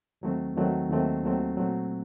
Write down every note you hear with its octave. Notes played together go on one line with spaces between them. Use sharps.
D#2 D#3 F#3 A3 C4
D#2 D#3 F#3 A3 C4
D#2 D#3 F#3 A3 C4
D#2 D#3 F#3 A3 C4
A#2 F#3 A3 C4